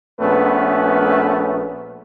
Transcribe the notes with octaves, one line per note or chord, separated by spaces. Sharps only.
A#1 A3 B3 C#4 B4